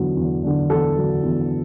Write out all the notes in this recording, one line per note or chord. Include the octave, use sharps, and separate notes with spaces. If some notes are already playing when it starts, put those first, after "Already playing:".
Already playing: E2 D3 F#3 D4
E2
D3 F#3 D4
E2 A4
D3 F#3 D4
E2